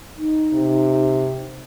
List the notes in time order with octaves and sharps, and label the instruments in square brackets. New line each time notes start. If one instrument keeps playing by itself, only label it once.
[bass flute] D#4
[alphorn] C3